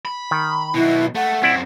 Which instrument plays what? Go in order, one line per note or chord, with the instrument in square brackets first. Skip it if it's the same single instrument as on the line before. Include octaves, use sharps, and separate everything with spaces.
[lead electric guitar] B5
[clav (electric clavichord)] D#3
[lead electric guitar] B2 F#3 [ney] E4
[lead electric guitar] A3 [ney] F#5
[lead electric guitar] F#2 C4 [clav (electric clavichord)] E4 D5